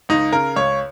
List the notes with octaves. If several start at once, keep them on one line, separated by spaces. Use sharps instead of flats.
C#2 D#4
C#3 A#4
C#2 C#5